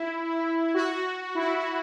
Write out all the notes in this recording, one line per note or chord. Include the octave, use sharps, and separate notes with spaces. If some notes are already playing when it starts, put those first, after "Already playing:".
Already playing: E4
F#4
E4
F#4